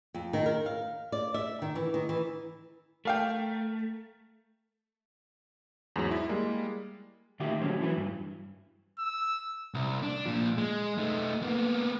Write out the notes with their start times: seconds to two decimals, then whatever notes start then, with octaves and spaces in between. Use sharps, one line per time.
0.14 F2
0.33 D#3
0.46 A#4
0.66 F5
1.12 D5
1.34 E5
1.62 D#3
1.75 E3
1.94 D#3
2.09 E3
3.05 A3 A#4 F5 G5
5.96 E2 G#2 F#3
6.11 E4
6.29 G3 G#3 A#3
7.40 D2 D#3 F4 G4 E5
7.60 D3 F3 F#3 A3 C#4
7.80 E3 F#3 E4 G#4 B4
7.97 G2
8.99 E6
9.74 C2
10.03 D4
10.25 A#2 F3
10.58 G#3
10.98 A3 D#4
11.42 A#3 B3